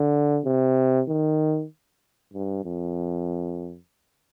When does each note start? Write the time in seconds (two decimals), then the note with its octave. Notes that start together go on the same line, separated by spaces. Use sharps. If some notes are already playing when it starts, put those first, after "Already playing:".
Already playing: D3
0.45 C3
1.08 D#3
2.33 G2
2.65 F2